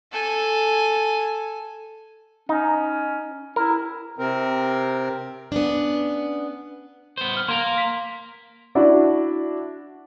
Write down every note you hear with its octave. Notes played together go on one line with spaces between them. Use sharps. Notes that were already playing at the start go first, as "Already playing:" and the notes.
A4 G#5
C#4 D#4
E4 A#4
C3 C4 A#4
B3 C#4 D4
B3 C5
C6 F6
A#3 A#4 A#5 C6
B6
D4 E4 F#4